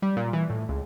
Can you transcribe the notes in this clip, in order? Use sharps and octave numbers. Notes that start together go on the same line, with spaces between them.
G3
A#2
E3
A2
C#2